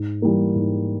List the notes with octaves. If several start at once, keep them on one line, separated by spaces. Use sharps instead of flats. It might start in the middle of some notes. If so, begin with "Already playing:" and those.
Already playing: G#2
E3 G3 A#3
G#2